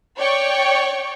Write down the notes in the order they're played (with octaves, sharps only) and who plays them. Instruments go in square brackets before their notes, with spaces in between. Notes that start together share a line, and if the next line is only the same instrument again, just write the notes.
[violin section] C#5 D5 G5 C#6